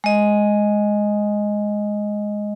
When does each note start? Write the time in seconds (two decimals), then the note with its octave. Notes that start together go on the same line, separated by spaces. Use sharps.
0.04 G#3 D#5